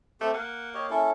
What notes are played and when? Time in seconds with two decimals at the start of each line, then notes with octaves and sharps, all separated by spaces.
0.21 A3 C4 G4 A4
0.34 A#3 F#5
0.74 G4 C#5 D#5
0.90 C#4 E4 A4